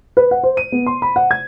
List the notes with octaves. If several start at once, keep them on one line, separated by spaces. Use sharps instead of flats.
B4
F#5
C5
D#7
B3
C6
B5
F#5
G#6